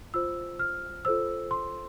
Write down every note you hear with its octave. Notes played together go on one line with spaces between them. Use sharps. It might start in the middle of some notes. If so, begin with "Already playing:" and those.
F4 C5 E6
F6
F4 A4 C5 E6
C6